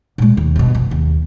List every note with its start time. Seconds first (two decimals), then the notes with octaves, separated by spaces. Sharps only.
0.18 A#2 G#3
0.37 D#2
0.56 G1 B2
0.75 F2
0.91 D#2